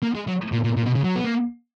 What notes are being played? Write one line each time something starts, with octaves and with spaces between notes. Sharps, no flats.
A#3
G#3
F#3
A#2
A#2
A#2
B2
C#3
F#3
B3
A#3